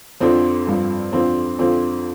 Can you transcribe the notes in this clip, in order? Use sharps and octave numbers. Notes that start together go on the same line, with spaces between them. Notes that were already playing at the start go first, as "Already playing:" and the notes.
F2 D3 F3 C4
G2 F3
F2 D3 F3 C4
F2 D3 F3 C4